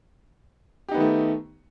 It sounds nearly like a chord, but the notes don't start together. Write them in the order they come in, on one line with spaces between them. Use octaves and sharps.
G4 D#4 B3 D#3 A3